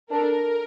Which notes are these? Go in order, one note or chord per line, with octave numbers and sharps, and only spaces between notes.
D4 A4 A#4